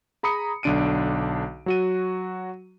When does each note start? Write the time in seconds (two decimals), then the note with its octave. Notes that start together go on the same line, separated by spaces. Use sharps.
0.23 G#4 A#5 B5 D#6 C#7
0.63 B1 D3 D4 D7 D#7
1.66 F#3 F#4 D#7